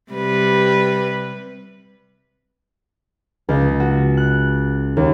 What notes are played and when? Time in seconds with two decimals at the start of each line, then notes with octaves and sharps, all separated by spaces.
0.12 C3 G3 B4
3.49 C#2
3.80 F#4
4.17 F#6
4.97 D#2